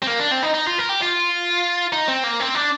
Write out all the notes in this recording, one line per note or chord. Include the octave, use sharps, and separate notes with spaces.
C4
A#3
D4
C4
D#4
D#4
F4
A#4
G4
F4
D#4
C4
A#3
C4
D4